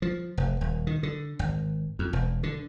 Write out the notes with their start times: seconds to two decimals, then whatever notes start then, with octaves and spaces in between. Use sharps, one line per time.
0.02 F3
0.37 F1
0.61 D#1
0.87 D#3
1.03 D3
1.39 G#1
1.99 F2
2.13 E1
2.43 D3